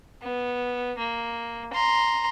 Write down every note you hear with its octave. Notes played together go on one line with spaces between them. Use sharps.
B3
A#3
A#5 C6